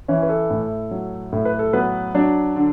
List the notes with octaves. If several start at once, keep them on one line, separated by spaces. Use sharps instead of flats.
E3 C#4 C#5
B4
A4
A2
F#3
A2 A4
B4
A4
F#3 B3 B4
F#3 D4 D5
D3